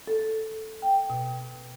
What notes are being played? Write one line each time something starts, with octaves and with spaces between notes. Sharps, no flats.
A4
G5
B2